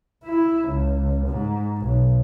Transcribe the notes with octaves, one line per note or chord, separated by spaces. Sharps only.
E4
C#2
G#2
B1